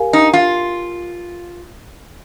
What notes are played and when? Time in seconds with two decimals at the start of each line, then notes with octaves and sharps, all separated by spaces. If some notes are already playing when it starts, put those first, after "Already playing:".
Already playing: G4 A#4 F5 G#5
0.13 D#4
0.33 F4